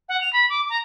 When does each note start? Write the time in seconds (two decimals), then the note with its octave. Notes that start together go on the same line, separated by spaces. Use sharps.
0.09 F#5
0.21 F7
0.33 B5
0.50 D6
0.70 A#5